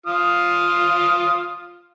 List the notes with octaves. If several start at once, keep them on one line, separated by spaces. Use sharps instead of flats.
F4 D#6 F6